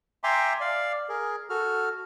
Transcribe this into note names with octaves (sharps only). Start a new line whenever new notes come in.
E5 G5 G#5 A#5 C6 D6
D5 F5
G#4 A#4
F#4 A4 F6